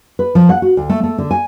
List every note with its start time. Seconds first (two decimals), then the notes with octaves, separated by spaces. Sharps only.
0.19 B4
0.35 F3
0.49 F#5
0.62 F#4
0.77 D2
0.90 A3
1.04 A3
1.18 D3
1.31 G#5